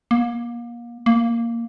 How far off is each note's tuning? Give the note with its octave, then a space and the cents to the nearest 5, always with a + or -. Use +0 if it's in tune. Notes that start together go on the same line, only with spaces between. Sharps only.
A#3 +30
A#3 -5